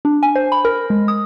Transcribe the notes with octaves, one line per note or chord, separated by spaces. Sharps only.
D4
G#5
C5
B5
A#4
G#3
D#6